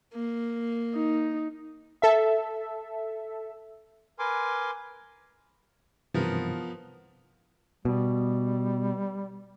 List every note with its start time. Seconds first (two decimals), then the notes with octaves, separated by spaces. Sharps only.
0.13 A#3
0.95 D#4
2.02 A4 E5
4.19 A#4 B4 G#5 C6 D6
6.14 G2 C3 E3 F3 B3 A#4
7.85 B2 G3